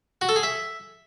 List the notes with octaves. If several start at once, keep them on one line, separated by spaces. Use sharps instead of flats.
F#4
A4
G#4
E5